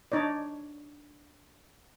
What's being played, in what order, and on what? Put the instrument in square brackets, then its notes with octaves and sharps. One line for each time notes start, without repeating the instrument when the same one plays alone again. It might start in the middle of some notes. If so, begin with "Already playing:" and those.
[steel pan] D4 D#4 C#5 D5